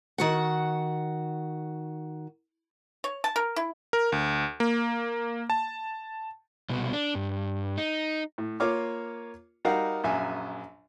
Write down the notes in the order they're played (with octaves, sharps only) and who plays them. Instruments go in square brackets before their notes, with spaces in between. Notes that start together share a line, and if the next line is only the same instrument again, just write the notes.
[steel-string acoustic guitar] D#3 F#4 F#5
[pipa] C#5
A5
A#4
E4
[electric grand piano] A#4
D2
A#3
A5
[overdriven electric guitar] C2 B2
D4
G2
D#4
[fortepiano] A2
A#3 F4 C#5 D6 F6
G3 D#4 F#4 A#4 F5 F#5
A#1 F#2 E5 G#5